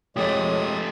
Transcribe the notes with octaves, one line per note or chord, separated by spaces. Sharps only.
F2 G#3 A3 G4 C#5 D#6